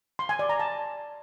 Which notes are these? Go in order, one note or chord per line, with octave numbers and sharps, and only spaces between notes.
C6
G#5
D5
A#5
A5